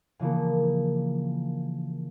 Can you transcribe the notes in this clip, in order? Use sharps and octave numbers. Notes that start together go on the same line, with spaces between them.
C#3 E3 F3 A#3